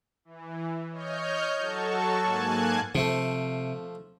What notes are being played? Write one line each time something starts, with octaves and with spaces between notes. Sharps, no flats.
E3
C#5 D#5 F6 G6
F#3 F#4 A4 A5 C#6
G#2 A#3 G#5 A5 F#6 G#6
C3 F3 A3